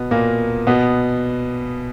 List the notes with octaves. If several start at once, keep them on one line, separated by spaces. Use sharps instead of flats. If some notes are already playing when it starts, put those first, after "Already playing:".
Already playing: B2 B3
A#2 A#3
B2 B3